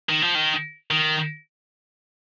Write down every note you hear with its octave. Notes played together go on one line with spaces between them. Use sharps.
D#3
F3
D#3
D#3